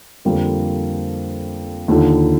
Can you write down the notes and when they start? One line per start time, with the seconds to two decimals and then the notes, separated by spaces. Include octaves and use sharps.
0.25 F2 D3 G3 A#3 F4
1.88 D#2 D3 F3